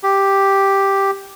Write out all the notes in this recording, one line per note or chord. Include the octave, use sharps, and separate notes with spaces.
G4